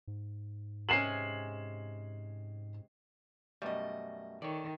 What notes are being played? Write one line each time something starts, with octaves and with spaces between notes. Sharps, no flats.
G#2
C3 G#3 C#4 C7 E7 F#7
F#2 B2 G3 A3 D#5
D#3 A4 C#5 D5